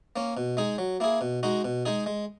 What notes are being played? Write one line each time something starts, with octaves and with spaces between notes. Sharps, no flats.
A#3 C#4
B2
G#3 D#4 G#4
F#3
A#3 E4 G#4
B2
G#3 D#4 F#4
B2
G#3 D#4 G#4
G#3